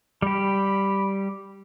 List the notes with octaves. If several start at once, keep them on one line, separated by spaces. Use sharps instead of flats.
G3 G4 B5